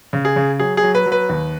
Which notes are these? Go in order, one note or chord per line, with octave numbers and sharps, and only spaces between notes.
C#3
G#4
C#3
F#3 G#4
G#4
F#3
B4
F#3
B4
D#2